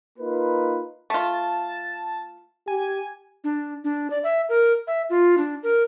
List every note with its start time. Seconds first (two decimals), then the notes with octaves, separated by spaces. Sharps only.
0.19 A#3 D#4 F4 B4
1.10 A3 F4 A5
2.68 G4 G#5
3.44 D4
3.84 D4
4.10 D5
4.24 E5
4.49 A#4
4.87 E5
5.10 F4
5.38 D4
5.63 A#4